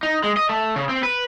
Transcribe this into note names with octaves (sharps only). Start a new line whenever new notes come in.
D#4
G#3
D#5
A3
C#3
C4
B4